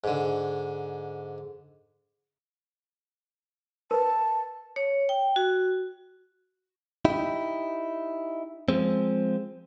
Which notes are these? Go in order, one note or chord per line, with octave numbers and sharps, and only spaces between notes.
G#2 D3
A#4 B4 A5
C#5
G5
F#4
D#4 E4 G4
F3 G#3 C4